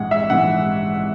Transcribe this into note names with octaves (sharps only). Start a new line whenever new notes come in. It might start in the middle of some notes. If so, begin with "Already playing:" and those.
Already playing: A#1 G#2 E3 G#3 F#5
E5
A#1 G#2 E3 G#3 F#5